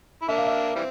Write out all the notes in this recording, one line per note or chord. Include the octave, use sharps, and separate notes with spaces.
E4
A#3 D4 E5
F5
E5
E3 G3 C4